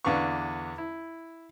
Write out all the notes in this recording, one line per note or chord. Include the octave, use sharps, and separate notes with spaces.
E2 D3 D4 B4 F5 C#6
E4